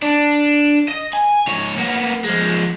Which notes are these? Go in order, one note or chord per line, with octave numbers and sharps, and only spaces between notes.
D4
D#5
G#5
G#2 C#5
A#3 B3
F3 G#3